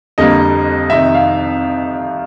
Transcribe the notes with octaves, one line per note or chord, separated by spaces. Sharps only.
F2 D3 G3 A#3 D#5
F2 C3 D#3 E5
F5